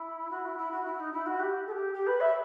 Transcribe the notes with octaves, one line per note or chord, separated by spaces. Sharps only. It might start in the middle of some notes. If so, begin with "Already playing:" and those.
Already playing: E4
F#4
E4
E4
F#4
E4
D#4
E4
F#4
G4
A4
G4
G4
B4
E5